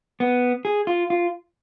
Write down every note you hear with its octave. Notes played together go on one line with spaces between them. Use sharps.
B3
G#4
F4
F4